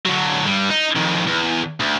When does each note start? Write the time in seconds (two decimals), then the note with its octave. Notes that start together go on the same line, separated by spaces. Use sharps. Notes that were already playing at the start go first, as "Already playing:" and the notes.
0.06 D3 F#3
0.46 G2 G3
0.71 D#4
0.96 F2 D#3
1.27 E2
1.80 D2